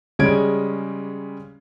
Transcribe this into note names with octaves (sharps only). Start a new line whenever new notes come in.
C#3 G3 G#3 C#4 G#6 D7